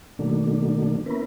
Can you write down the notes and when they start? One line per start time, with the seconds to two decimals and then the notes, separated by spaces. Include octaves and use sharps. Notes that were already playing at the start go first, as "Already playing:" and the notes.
0.19 B2 D#3 F#3 A3 A#3 D4
1.06 A#3 B3 C#4 E4 A#4 B4